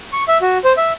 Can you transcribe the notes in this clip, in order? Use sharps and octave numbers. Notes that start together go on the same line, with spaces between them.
C#6
E5
F#4
C5
E5